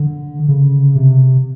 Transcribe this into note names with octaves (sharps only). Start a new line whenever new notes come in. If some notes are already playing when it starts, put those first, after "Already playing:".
Already playing: D3
C#3
C3